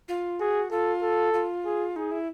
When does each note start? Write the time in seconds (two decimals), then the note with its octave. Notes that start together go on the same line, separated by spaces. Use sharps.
0.08 F4
0.40 F#4 G#4
0.71 F4 A4
1.02 A4
1.34 F4
1.65 G#4
1.96 D#4 G#4
2.11 E4